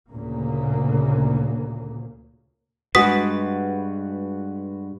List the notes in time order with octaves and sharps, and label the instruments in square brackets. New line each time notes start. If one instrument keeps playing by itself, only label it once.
[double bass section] D2 A#2 C#3 A#3
[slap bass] G2 [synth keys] G#3 F#4 B4 [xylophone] D#6 B6